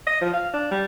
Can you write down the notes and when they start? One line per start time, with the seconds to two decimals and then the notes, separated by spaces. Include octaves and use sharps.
0.07 D#5
0.21 F3
0.33 F5
0.54 D4
0.71 G3